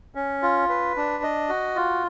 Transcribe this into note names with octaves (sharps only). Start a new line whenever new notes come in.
C#4
F4
B4
D4
D#5
F#4
F4